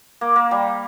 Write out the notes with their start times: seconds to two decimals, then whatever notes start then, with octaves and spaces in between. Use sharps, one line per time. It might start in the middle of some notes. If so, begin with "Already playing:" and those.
0.21 A#3
0.36 A#3
0.51 G3